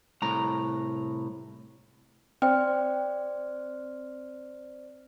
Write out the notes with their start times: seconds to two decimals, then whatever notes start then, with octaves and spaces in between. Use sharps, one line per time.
0.22 C2 A2 A#5
2.42 C4 C5 D5 G5 F6